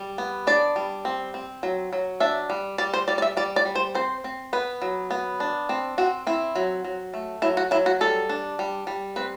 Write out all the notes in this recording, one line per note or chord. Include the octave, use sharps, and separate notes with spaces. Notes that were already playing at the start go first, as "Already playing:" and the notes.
Already playing: G3
B3
D4 D5
G3
C4
C4
F#3
F#3
D4 E5
G3
G3 D5
C5
G3 D5
D5
E5
G3 D5
D5
G3
C5
C4 C5
C4
B3 B4
F#3
B3
D4
C4
C4 F#4
C4 E4
F#3
F#3
A3
F#3 E4
F#4
F#3 E4
F#4
G3 A4
D4
G3
G3
C4 B4